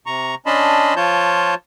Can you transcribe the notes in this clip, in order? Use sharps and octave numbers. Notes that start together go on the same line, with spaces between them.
C3 A#5 C#6
C#4 D4 D#5 A5 B5 C6
F3 F4 C#5 A5 G6